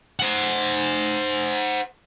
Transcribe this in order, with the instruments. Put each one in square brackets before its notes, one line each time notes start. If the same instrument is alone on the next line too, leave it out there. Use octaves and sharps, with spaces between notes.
[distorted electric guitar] C5 F#5